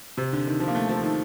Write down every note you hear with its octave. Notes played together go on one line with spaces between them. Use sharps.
C3
D3
D#3
F3
A#3
A3
F3
D#3